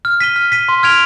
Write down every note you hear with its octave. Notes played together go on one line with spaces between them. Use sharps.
F6
B6 D#7 G7
F6
B6 D#7 G7
C6
F6 G#6 D7 F7